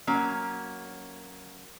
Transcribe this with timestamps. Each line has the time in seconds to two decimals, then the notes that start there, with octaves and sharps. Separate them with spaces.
0.07 F#3 A#3 C#4